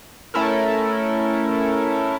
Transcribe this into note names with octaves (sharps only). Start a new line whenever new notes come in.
A3 C#4 E4 A4 A#4